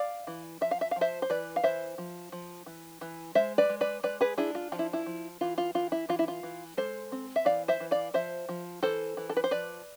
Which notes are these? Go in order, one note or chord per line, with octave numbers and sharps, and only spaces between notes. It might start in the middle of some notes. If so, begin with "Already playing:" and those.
Already playing: D5 F5
E3
F3 E5
F5
E5
F3 F5
C5 E5
C5
E3 B4 D5
F5
E3 C5 E5
F3
F3
E3
E3
G#3 C5 E5
B4 D5
G#3
B4 D5
G#3 B4 D5
G#4 B4
D4 E4 G#4
F4
F3 F4
E4
E4
F3
E3 F4
F4
E3 F4
E4
E3 F4
E4
F4
E3
G#3 A4 C5
C4
E5
E3 D5 F5
C5 E5
E3
D5 F5
F3 C5 E5
F3
E3 A4 C5
E3
A4
B4
C5
F3 B4 D5